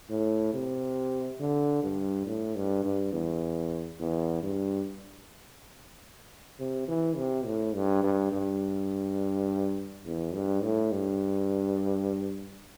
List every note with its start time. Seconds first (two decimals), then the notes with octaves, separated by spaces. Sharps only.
0.10 A2
0.53 C3
1.40 D3
1.83 G2
2.26 A2
2.55 G2
2.84 G2
3.13 E2
3.99 E2
4.43 G2
6.59 C3
6.88 E3
7.17 C3
7.46 A2
7.75 G2
8.03 G2
8.32 G2
10.06 E2
10.34 G2
10.63 A2
10.92 G2